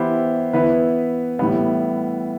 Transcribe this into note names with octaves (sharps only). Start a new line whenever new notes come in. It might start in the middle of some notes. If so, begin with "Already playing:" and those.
Already playing: E3 B3 E4 G4 C5
E3 B3 E4 B4
A2 E3 G3 B3